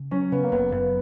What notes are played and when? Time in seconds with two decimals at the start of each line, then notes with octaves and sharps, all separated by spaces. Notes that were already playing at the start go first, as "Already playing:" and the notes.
Already playing: C#3
0.11 F#3 C#4
0.32 C#3 B3
0.44 A#3
0.52 F#1 B3
0.72 F#2 B3